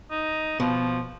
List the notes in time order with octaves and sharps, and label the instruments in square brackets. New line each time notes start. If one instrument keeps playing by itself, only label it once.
[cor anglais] D#4
[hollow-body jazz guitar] B2 [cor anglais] F3